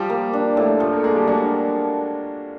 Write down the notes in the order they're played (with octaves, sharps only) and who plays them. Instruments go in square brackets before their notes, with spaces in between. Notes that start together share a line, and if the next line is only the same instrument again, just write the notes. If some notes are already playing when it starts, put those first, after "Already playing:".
Already playing: [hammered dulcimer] F3 [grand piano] G3 G4
[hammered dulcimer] A#3
D4
A2
[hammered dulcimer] F3 [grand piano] A3 A4
[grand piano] A#3 A#4
A4
[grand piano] G#3 G#4 [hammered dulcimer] A#3
[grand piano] G3 G4
[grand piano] F#3 F#4 [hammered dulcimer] D4